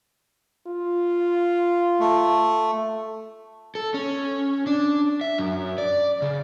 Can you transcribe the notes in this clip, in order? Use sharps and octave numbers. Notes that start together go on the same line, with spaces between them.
F4
A3
A4
C#4
D4
E5
F#2
D5
C#3